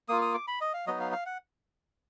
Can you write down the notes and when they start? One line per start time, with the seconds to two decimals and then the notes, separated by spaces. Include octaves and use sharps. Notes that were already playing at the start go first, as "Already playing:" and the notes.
0.09 A#3 F4 D#6
0.22 D#6
0.34 D6
0.48 B5
0.61 D#5
0.73 F5
0.87 F#3 B3 D#4 D#5
1.00 F5
1.12 F5
1.26 F#5